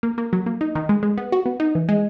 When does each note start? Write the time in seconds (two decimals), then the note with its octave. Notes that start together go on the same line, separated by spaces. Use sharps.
0.03 A#3
0.18 A#3
0.33 F#3
0.46 A#3
0.61 D#4
0.75 D#3
0.89 G#3
1.03 G#3
1.18 B3
1.32 F#4
1.46 B3
1.60 D#4
1.75 E3
1.89 G#3